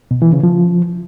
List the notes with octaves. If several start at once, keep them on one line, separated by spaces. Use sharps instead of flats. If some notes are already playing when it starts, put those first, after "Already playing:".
B2
E3
C#3
F3